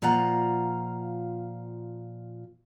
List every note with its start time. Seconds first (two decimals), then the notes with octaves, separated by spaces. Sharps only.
0.02 A#2 F3 F4 F#5 A#5